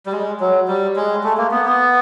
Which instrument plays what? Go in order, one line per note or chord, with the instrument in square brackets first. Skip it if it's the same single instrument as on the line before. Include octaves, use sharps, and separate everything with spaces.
[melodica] G3
G#3
F#3
G3
G#3
A3
A#3
B3
B3